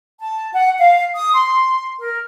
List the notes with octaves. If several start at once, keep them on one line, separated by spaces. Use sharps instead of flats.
A5
F#5
F5
D#6
C6
A#4